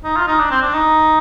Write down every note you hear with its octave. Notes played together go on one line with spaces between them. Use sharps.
D#4
F4
D#4
D4
C4
D4
D#4